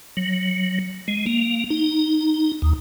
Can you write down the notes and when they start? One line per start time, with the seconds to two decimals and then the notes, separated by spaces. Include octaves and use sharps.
0.17 F#3
1.08 G#3
1.26 A#3
1.70 D#4
2.62 D#2